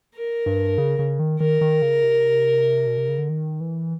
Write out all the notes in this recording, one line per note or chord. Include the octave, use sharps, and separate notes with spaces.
A#4
G2
C#3
C#3
D#3
D#3 A#4
D#3
C#3
C3
B2
C3
C#3
D3
D#3
E3